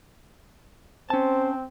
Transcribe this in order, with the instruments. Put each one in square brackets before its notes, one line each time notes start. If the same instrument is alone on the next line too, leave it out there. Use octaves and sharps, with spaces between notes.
[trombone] C4 [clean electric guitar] C#4 A5 [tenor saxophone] C5